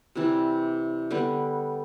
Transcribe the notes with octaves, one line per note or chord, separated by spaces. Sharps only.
C3 E3 G3
D3 G3 B3